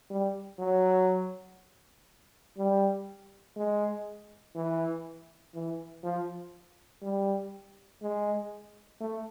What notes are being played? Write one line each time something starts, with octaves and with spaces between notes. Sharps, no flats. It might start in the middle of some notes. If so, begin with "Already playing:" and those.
G3
F#3
G3
G#3
E3
E3
F3
G3
G#3
A3